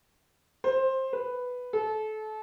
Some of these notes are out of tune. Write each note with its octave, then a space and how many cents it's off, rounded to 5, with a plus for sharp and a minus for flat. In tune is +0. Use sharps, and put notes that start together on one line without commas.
C5 +15
B4 +5
A4 -30